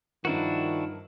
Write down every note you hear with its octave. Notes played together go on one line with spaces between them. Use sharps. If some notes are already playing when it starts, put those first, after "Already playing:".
G2 D#3 F3 D4 E4 F#4 A#4